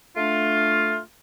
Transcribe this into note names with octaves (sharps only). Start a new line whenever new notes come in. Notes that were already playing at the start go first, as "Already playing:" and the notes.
A3 D4 F4